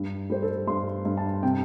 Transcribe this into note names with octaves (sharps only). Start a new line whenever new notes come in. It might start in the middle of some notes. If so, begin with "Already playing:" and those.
Already playing: G2
G3 C5
A4
G2 C6
G2
A5
C3 G5